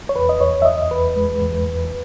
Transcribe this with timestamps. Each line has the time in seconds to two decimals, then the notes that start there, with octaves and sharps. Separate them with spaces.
0.09 C#5
0.15 E2 B4
0.29 D#5
0.40 E2 C#5
0.62 E5
0.65 E2 D#5
0.91 E2 B4
1.16 G#3
1.42 E2
1.67 E2